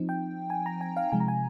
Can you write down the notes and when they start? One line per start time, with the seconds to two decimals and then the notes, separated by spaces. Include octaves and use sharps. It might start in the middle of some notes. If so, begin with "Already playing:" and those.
Already playing: F3 C4 D#4
0.09 G5
0.50 G#5
0.66 A#5
0.81 G#5
0.97 F5
1.12 C3 F3 G#3 G#5
1.20 A#5
1.28 G#5